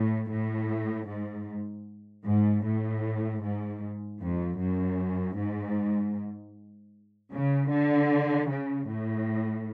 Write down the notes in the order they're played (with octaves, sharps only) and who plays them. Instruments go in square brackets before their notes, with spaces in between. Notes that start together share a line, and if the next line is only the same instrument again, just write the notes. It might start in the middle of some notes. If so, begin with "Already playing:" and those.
Already playing: [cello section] A2
A2
G#2
G#2
A2
G#2
F2
F#2
G#2
C#3
D3
C#3
A2